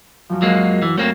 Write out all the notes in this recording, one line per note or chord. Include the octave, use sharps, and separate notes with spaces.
F#2 F3
F#3 G#3 A#3 F#4
E3
A3 A#3 C4 C#5